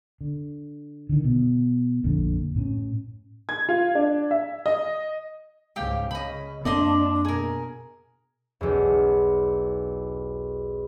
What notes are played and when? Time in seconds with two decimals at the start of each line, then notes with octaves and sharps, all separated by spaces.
0.21 D3
1.09 D3 D#3
1.24 B2
2.04 A#1 F2 A#2 D3
2.55 A2 C4 C#4
3.49 G#6
3.69 F4
3.95 D4
4.31 E5
4.66 D#5
5.76 C#2 G#2 G4 F5 G5
6.11 C#3 D#5 B5
6.65 F#2 A#3 C4 D4 D5 D#5 C6
7.25 B2 G#4 A#4
8.61 B1 E2